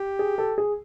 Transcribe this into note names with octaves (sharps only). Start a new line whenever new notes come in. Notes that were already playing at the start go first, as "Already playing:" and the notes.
Already playing: G4
G#4
A4
G#4